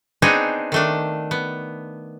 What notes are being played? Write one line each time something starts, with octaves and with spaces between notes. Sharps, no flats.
B3 C4 D4 D#4 G#4 C#5
D#3 A3 D4
B3